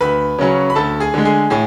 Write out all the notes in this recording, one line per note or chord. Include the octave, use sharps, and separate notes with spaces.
D2 B4 B5
C#3 F#3 C#4
B5
D2 A4 A5
G#4 G#5
D3 G#3
G#4 G#5
A2 G#4 G#5